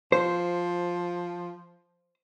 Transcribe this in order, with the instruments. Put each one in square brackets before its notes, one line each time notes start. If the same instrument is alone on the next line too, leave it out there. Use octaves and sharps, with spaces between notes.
[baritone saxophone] F3 [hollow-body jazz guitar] C5